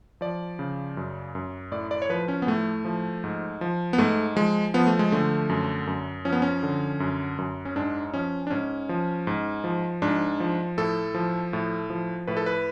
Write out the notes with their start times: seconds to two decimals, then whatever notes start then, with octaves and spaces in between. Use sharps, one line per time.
0.21 F3 D5
0.59 C#3
0.97 F#2
1.35 F#2
1.72 A2 D5
1.91 D5
2.02 C#5
2.09 F3 B4
2.28 C#4
2.42 B3
2.47 A2 A3
2.85 F3
3.24 G#2
3.61 F3
3.93 B3
3.98 G#2 A3
4.36 F3 G#3
4.74 F3 B3
4.87 A3
4.99 G#3
5.12 D3 A3
5.49 F#2
5.87 F#2
6.25 F3 C#4
6.32 B3
6.42 C#4
6.63 D3
7.00 F#2
7.38 F#2
7.65 C#4
7.76 G#2 D4
8.14 F3 C#4
8.47 D4
8.50 G#2 C#4
8.89 F3
9.27 G#2
9.64 F3
10.02 G#2 D4
10.40 F3
10.78 A2 A4
11.14 F3
11.53 A2
11.90 F3
12.27 A2 B4
12.37 A4
12.46 B4